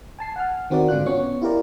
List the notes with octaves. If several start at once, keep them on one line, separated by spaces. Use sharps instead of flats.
G#5 A5 C7
F#5 G#5 F6
D#3 C4 F#4 A#4 D5
G#2 D3 D4 F4 F#6
B3 C#4 C#5 C#6
E4 F4 G4 A#4 D5